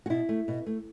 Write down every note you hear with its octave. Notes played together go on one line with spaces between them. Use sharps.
F#4
B2 E4
A3
B2
A3